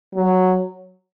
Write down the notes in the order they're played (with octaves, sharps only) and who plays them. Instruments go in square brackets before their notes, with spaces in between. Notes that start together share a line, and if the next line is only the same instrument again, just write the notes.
[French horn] F#3